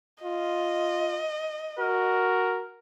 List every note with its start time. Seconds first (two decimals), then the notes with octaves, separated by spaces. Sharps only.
0.24 F4 D#5
1.79 F#4 A#4